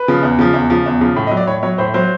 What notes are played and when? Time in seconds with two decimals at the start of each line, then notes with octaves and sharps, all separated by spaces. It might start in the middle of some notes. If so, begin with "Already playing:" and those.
Already playing: B4
0.08 C#3 F3
0.23 E2
0.39 C#3 F3
0.54 E2
0.70 C#3 F3
0.86 E2
1.01 C#3 F3
1.16 A2
1.27 D#5
1.31 F#3
1.37 D5
1.47 A2 C#5
1.63 F#3 C#5
1.78 A2 C5
1.94 F#3 C5